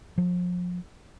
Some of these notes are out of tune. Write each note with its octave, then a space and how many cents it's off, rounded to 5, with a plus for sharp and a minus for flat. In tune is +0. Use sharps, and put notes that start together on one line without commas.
F3 +35